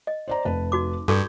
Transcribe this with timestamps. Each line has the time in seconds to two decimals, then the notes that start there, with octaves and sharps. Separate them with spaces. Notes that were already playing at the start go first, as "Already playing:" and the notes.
0.07 D#5
0.28 C5 D5 A#5
0.45 F1 B4 A5
0.72 D#4 F#4 D6
1.08 G2 F#4 A4 C#6 D6 G6 G#6